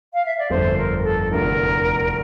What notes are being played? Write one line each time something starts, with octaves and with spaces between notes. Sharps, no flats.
F5
E5
D5
G1 F2 D3 A3 D4 C5
A#4
A#4
A4
F1 E2 D3 A#4